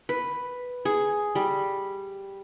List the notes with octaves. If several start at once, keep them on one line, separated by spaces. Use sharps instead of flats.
B4
G#4
G3